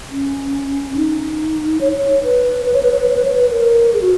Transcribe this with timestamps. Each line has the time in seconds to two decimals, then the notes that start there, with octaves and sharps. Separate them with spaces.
0.11 C#4
0.96 D#4
1.81 C#5
1.97 C#5
2.23 B4
2.66 B4
2.74 C#5
2.83 B4
2.92 C#5
3.00 B4
3.09 C#5
3.17 B4
3.25 C#5
3.34 B4
3.51 A#4
3.93 G#4
4.02 F#4